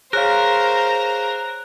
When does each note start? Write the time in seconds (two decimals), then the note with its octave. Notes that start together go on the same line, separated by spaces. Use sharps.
0.13 G#4 A#4 C5 C#5 F5 A#5 F#6